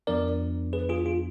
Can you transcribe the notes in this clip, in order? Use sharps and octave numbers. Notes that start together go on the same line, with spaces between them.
F2 F3 B3 D4 A#4 D5
G#4 B4
F4 G#4
F4